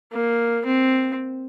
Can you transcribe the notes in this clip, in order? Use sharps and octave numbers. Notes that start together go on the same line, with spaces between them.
A#3
C4